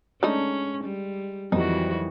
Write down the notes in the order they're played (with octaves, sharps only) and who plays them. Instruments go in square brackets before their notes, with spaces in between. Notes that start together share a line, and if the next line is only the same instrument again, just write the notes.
[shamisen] D3 A3 D#4 [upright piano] G#3 [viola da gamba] C#4
[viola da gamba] G3
[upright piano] F2 F#3 G3 [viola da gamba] D#3 E3 F#4 [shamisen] D#4